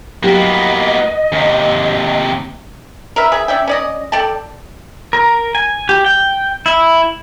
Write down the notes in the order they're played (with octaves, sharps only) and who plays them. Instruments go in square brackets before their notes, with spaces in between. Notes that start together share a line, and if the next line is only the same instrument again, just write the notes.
[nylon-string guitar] F#3 E4 G4 [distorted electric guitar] A#3 B3 [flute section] D#5
[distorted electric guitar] D#2 C3 [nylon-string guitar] C#4
[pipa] A#4 B4 E5
G#4 E5
C#4 D5 E5 G5
C#4 D5 D#5
A4 D5 G5 A5
[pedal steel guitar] A#4
G#5
G4
G5
E4